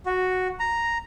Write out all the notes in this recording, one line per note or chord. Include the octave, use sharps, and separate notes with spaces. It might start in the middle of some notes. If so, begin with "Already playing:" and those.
F#4
A#5